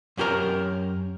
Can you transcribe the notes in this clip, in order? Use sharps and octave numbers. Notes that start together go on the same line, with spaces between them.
F#2 C#4 G4 A4 A#4 A#5